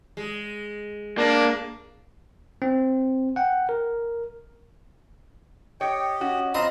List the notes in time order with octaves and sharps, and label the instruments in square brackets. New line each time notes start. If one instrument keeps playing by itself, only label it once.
[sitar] G#3
[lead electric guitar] A#3 [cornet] D4
[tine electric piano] C4
F#5 G5
A#4
[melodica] G4 D#5 [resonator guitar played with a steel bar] C#5 [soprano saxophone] G5
[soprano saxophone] C#4 [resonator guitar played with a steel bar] F#4
[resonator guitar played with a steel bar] C4 [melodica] F4 B5 [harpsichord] D#5 [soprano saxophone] A#5